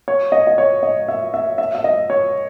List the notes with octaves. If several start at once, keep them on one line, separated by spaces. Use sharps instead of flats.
C#5
D#5
D#5
C#5
D#5
E5
E5
E5
E5
D#5
C#5